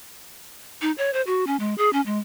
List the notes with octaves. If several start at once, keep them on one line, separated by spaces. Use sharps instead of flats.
D#4
C#5
C5
F#4
C#4
G#3
G#4
C#4
G#3